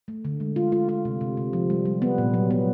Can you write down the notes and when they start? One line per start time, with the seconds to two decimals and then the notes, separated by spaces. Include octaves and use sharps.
0.08 A3
0.25 D3
0.40 G#3
0.56 F4
0.72 F4
0.89 F4
1.05 C3
1.21 C3
1.37 C3
1.53 F3
1.70 G3
1.85 G3
2.02 B3
2.18 A#2
2.34 F#3
2.51 B3